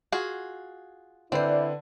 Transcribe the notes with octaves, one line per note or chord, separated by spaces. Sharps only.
F4 F#4 G#4
D3 C4 E4 B4 C5 D5